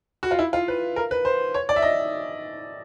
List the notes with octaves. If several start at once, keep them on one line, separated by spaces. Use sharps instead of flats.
F#4
F4
E4
F4
B4
A#4
B4
C5
C#5
D5
E5
D#5